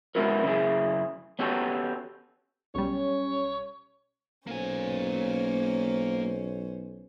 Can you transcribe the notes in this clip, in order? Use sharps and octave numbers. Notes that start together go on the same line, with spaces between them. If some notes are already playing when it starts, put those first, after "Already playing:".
G#3 B3 C#4 E4 F#4 A#4
F#2 C#3 D#4 E4 G#4
B3 C#4 F#4 G4 A4
B1 G3 C#4 C#5
B1 A#3 C#4 C5 G#5